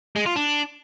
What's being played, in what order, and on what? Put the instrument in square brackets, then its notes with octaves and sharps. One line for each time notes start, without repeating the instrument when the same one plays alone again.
[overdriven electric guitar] G#3
F4
D4